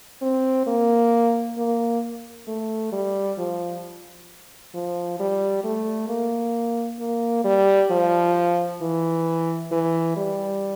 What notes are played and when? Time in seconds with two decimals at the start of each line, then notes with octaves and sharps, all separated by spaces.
0.22 C4
0.67 A#3
1.58 A#3
2.48 A3
2.92 G3
3.38 F3
4.74 F3
5.20 G3
5.64 A3
6.09 A#3
6.99 A#3
7.45 G3
7.91 F3
8.81 E3
9.72 E3
10.17 G3